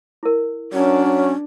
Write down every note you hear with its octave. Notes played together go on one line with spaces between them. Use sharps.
E4 A#4
F#3 C#4 D4